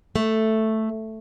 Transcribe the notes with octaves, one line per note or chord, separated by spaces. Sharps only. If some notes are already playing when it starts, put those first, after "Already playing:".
A3